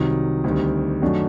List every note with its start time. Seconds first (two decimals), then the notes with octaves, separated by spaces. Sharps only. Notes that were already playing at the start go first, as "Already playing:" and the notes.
Already playing: C2 C3 D#3 F#3
0.44 D2 C3 D#3 G3
1.02 F#2 D#3 A3 D4 F#4